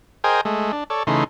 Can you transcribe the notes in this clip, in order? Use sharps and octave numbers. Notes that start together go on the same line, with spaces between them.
G#4 A#4 C5 D#5 G5 G#5
G#3 A3
D4
A4 C#5 D5
C#3 E3 A3 D#4 C6